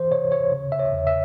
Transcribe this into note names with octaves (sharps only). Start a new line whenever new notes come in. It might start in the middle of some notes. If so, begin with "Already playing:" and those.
Already playing: E3 C5
C3 C#5
C#5
C#3
E5
C#5
E2
E5